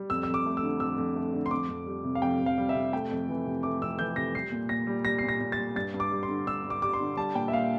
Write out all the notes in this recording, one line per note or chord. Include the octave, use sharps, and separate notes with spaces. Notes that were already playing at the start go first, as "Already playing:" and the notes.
Already playing: G3
F2 E6
F2 E6
D6
A3
E6
D3
F2 E6
F2
A3
D3
C6
F2 D6
F2
G3
C3
F5
F2 G5
F2
F5
G3
E5
C3
A3 G5
F2
E3
C3
A3 D6
F2 E6
E3 G6
C3 A#6
G3 C7
A#2
A#2 A#6
G3
G3 A#6
A#2 C7
A#6
A#2
A6
G3
G2 A6
G2
D6
G3
C6
D3
G2 E6
G2
D6
G3 D6
C6
D3
G3 A5
A#2 G5
E5
A#2 F5